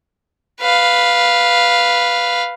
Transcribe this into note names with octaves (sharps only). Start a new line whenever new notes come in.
B4 F5